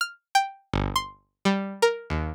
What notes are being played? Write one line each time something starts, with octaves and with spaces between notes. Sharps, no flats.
F6
G5
G1
C6
G3
A#4
D#2